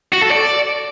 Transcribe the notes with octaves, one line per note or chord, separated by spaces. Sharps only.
F#4
A4
D5